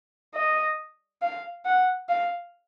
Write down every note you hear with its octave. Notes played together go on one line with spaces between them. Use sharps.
D#5
F5
F#5
F5